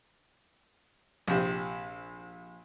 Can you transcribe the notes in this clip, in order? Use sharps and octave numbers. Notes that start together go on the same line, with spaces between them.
A#1 C3